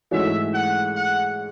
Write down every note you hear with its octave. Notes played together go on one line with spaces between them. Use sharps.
G#2 E3 A3 C#4 F#4 E5
F#5
F#5